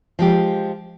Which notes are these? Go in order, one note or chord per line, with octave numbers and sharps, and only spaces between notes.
F3 G#3 G4